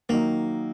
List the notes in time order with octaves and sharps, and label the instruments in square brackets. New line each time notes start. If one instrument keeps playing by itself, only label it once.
[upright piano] D#3 F#3 D#4 [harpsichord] A#3